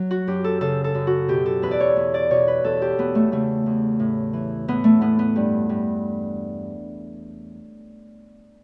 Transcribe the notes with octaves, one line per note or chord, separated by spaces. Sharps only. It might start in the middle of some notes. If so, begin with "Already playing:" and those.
Already playing: F#3
F#4
F#2 G4
A4
C#3 A4
A4
F#2
F#4
B2 G4
A4
E2 B4
D5
C#5
E2
D5
B2 C#5
B4
E2 A4
G4
E2 B3
A3
C#3 A3
E2
A2
E3
A2 B3
A3
A2 B3
B3
G2
G2